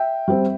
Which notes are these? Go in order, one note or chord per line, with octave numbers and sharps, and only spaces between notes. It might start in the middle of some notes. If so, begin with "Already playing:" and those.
Already playing: E5 G5
G3 C4